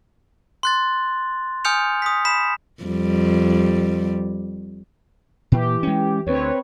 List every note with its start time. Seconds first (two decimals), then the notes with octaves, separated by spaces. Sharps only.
0.63 C6 F#6 A6
1.65 G#5 D#6 F6 G6 C#7 F7
2.02 D#6 B6
2.25 B5 B6 E7
2.83 F2 G3
5.52 A#2 E3 G4
5.83 G#3 C#4
6.27 D2 C4 B4 C#5